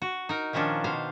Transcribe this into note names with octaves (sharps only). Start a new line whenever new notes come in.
F#4
D#4 A#4
A#2 D#3 F3 C#4 D4
B2 C5 F5